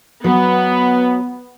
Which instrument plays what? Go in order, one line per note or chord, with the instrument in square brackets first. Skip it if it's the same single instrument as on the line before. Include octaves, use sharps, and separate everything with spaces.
[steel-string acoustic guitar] F#3 [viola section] B3